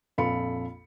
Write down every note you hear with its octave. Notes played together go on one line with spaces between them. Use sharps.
A#1 F2 A4 F5 B5 C#7